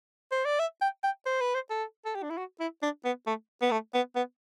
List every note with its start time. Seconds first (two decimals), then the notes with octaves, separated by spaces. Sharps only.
0.32 C5
0.45 D5
0.59 E5
0.82 G5
1.04 G5
1.26 C5
1.41 B4
1.55 C5
1.70 A4
2.05 A4
2.15 G4
2.23 D4
2.30 E4
2.37 F#4
2.60 E4
2.82 D4
3.05 B3
3.27 A3
3.62 B3
3.71 A3
3.94 B3
4.16 B3